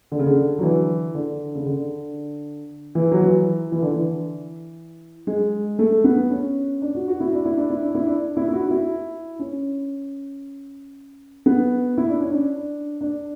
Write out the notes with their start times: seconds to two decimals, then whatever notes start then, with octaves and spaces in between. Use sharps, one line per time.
0.12 D3
0.19 C#3
0.27 D3
0.59 F#3
0.63 E3
1.15 D3
1.55 C#3
1.66 D3
2.95 E3
3.11 F#3
3.20 E3
3.72 E3
3.82 D3
3.92 E3
5.27 G#3
5.79 A3
6.04 B3
6.30 C#4
6.82 D4
6.95 F#4
7.08 F#4
7.20 E4
7.33 D4
7.45 E4
7.58 D4
7.70 E4
7.82 D4
7.95 E4
8.07 D4
8.37 E4
8.48 E4
8.53 F#4
8.66 F#4
8.71 E4
9.39 C#4
11.46 B3
11.98 E4
12.09 D4
12.21 C#4
12.32 D4
13.01 D4